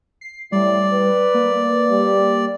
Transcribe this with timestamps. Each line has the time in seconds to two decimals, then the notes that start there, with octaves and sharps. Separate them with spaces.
0.21 C7
0.52 A2 G3 D5
0.93 B4
1.34 A#3
1.90 G3